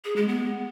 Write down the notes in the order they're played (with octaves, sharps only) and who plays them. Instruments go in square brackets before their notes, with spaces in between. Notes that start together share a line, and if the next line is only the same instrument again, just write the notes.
[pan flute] G#4
G#3
B3